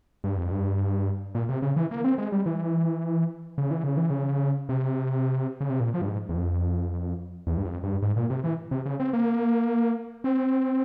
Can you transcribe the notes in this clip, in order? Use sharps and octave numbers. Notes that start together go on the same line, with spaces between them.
G2
F2
G2
A#2
C3
C#3
E3
A#3
C4
G#3
G3
E3
C#3
E3
C#3
E3
C#3
C3
C#3
C3
A#2
F3
G2
G#2
E2
F2
E2
G2
F2
G2
G#2
A#2
C3
E3
C3
C#3
C4
A#3
C4